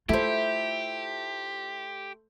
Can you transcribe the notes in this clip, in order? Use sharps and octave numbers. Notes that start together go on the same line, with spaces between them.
A3 E4 F4 G4 C5 E5